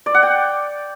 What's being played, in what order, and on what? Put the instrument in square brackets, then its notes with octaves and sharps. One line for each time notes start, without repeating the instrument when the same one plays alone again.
[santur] D5
F#5
G5